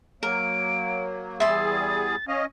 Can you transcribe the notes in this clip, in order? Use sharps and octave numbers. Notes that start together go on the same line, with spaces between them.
F#3 A#3 A#4 D7
E2 G3 G#4 E5 C6 A6
C#4 D#5 F5